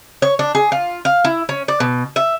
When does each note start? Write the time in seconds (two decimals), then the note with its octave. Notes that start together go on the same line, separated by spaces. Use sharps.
0.22 C#5
0.39 D4
0.55 G#4
0.72 F4
1.05 F5
1.25 E4
1.49 C#4
1.68 D5
1.80 B2
2.16 E5